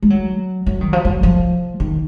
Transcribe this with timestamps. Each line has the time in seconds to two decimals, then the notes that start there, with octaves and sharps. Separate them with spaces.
0.02 G#3
0.10 F#3
0.66 F#3
0.81 D#3
0.93 F3
1.05 F#3
1.23 F3
1.80 D#3